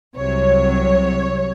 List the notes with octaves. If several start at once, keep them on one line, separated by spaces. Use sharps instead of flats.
C2 C3 F#3 C#5